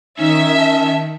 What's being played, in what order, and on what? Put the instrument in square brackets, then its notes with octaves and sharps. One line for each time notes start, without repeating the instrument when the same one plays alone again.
[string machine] D#3 [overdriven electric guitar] C#4 [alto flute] D#4 [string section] E5
[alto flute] A5